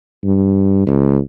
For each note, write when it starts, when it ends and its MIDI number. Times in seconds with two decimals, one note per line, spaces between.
0.23 0.83 43
0.87 1.17 37